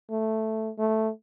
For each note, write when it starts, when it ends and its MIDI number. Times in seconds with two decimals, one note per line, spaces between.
0.10 0.70 57
0.78 1.09 57